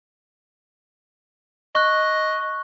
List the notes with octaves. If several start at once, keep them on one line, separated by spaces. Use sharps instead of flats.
D#5 C#6 F#6